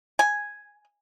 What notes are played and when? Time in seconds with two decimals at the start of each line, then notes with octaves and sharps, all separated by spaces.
0.19 G#5